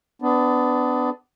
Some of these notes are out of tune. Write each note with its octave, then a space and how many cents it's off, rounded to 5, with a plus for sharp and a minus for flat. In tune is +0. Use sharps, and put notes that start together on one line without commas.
B3 +25 D4 +0